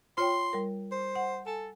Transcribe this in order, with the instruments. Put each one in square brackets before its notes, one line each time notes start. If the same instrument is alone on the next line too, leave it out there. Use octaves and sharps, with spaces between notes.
[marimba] F4 C#5 G5 [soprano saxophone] C6
[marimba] G3 A#4
[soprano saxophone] C5
[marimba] F#5
[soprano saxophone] A4 [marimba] G#5